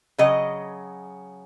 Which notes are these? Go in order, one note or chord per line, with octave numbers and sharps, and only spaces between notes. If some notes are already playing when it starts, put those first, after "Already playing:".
C#3 F#3 D#5